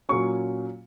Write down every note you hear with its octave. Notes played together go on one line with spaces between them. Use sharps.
A#2 F#3 C#4 C#6